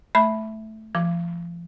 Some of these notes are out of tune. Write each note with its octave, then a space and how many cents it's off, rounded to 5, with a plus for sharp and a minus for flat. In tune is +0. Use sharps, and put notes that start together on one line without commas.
A3 -5 E5 +0 B5 +0
F3 -35 D6 -5